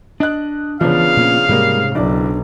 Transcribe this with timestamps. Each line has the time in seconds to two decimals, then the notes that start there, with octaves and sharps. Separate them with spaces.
0.20 D4 D#5 F#6
0.81 C#3 E3 F3 B3 D4 F5
1.16 A#2 A#3 C#4
1.49 G#2 C3 G3 G#3 A#3
1.95 F#1 B1 D4 E4 D5